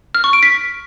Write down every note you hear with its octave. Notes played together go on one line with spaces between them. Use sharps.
F6
C#6
D7
B6